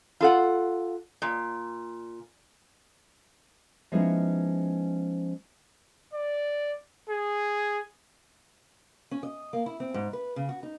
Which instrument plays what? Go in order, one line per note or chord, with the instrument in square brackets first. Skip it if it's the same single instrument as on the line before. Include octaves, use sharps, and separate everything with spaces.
[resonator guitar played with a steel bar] F4 A4 F#5
A#2
[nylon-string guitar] F3 G#3 B3 C#4 D#4 E4
[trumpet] D5
G#4
[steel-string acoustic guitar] C#4
D#5
A#3
E4
C4
G#2
B4
C#3
F#4
D#4